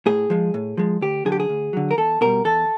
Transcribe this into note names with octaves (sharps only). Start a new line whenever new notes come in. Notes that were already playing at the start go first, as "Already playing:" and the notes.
A2 G#4
F3 G#3
A2
F3 G#3
D2 G4
D3 F#3 G#4
G4
G#4
D2
D3 F#3
A#4
E2 A4
B2 G3 A#4
E2 A4